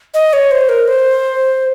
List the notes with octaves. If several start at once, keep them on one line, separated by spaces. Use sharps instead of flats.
D#5
C#5
C5
A#4
C5